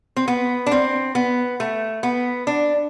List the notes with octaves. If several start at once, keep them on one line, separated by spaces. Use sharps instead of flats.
C4
B3
D4
C4
B3
A3
B3
D4